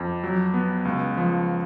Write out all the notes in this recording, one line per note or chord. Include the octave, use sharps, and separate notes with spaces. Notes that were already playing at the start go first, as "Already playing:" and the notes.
Already playing: F2
F#3
B3
C#2
F3